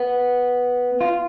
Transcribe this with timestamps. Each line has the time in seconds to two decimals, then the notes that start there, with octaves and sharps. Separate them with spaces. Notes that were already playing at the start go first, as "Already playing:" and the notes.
Already playing: B3
1.01 F4